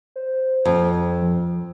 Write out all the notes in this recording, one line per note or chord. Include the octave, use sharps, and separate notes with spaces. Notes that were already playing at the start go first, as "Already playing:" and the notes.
C5
F2
F3